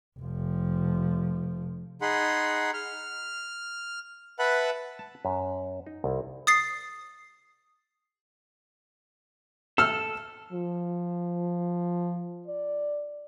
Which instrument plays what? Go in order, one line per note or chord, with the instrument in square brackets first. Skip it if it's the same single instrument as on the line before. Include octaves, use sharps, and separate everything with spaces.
[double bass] F1 F3
[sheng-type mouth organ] D#4 G#4 F#5 B5 C6
F6
B4 E5 F#5 A5 B5 F#6
[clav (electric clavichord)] A5
F#2
D#4
C2
[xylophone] D#6 A6 C7
[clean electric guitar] A4 [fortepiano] E6 F6
[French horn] F3
D5